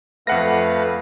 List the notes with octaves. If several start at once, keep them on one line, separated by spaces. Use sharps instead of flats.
F2 A3 B4 F5 F#5 A#6